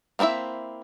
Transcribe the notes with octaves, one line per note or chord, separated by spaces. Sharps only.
A#3 C4 D4 E4 E5